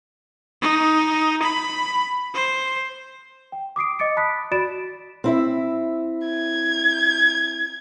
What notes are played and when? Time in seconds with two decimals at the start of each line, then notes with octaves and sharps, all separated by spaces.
0.62 D#4
1.43 B5
2.35 C5
3.52 G5
3.76 D6 D#6 C7 D7
3.99 D#5 D6 A6 C#7 D7
4.17 A5 B5 D#6 F#6 B6
4.51 F#4 D5 B5 A6 D7 E7
5.24 C4 E4 E5
6.27 G#6